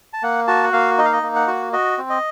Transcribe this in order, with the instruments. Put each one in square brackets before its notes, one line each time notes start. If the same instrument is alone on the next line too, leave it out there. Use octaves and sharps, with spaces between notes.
[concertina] A5
A#3 F#5
F#4 A5
F#5
A#3 F5
D#4 D#5
F5
D#5
A#3
F#5
F#4
F#4 D#5
C4
D#5